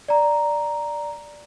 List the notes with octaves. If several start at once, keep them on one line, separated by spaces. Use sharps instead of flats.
D5 A#5